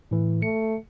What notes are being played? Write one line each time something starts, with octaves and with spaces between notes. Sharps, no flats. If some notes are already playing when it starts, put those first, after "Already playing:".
A2 E3
A3 C#7